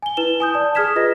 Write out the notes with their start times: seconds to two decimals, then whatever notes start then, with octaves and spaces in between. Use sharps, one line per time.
0.02 G#5 G7
0.17 E4 B4 E7 G7
0.40 G#5 D#6 G6
0.54 D5 A5
0.75 G#4 D#6 F6 G#6 B6 E7
0.96 F4 B4 D#5 A#6